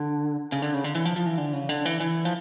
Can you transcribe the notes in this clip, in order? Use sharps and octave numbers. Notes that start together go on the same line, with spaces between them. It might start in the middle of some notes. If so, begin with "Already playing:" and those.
Already playing: D3
C#3
D3
C#3
D3
E3
F3
F3
E3
D3
C#3
D3
E3
E3
F3